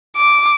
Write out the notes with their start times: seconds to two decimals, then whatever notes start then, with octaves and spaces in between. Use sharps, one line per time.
0.17 D6